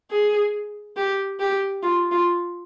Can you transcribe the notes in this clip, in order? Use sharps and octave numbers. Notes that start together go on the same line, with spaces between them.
G#4
G4
G4
F4
F4